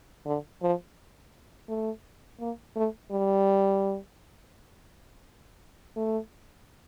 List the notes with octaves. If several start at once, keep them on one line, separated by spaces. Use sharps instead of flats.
D3
F3
A3
A#3
A3
G3
A3